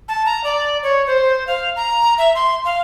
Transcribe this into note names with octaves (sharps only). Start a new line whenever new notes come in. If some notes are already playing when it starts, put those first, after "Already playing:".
A5
A#5
D5
C#5
C5
F5
A#5
E5
C6
F5